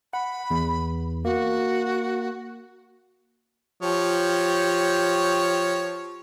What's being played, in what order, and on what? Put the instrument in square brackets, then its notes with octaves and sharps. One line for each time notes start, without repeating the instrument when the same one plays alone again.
[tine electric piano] F#5 [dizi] B5
[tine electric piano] E2
[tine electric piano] A#3 [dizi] F#4
[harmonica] F3 G4 C#5